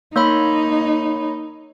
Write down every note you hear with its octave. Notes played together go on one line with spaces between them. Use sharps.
A#3 D#4 C#5 B5